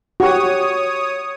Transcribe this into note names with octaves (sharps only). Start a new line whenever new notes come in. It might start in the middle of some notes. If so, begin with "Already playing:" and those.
F#4 G4 C#5 D#6